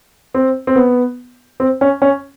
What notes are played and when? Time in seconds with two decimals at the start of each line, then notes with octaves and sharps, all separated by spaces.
0.34 C4
0.67 C4
0.76 B3
1.60 C4
1.81 C#4
2.02 C#4